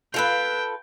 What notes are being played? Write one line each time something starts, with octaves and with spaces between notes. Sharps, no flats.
F4 A4 B4 G5